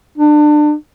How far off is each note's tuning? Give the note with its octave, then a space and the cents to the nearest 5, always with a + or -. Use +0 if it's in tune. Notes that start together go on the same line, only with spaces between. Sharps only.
D4 +25